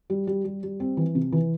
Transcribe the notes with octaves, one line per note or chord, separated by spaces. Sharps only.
G3
G3
G3
G3
C4
E3
C3
E3